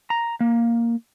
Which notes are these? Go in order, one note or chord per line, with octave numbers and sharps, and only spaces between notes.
A#5
A#3